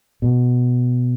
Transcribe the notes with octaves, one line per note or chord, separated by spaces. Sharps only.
B2